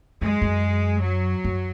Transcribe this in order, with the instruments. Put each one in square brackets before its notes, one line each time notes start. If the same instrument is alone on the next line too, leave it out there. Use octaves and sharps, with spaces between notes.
[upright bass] F#2 [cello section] G#3
[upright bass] F#2
[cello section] F#3
[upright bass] F#2